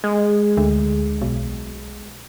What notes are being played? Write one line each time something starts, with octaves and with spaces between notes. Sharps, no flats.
G#3
D2
B1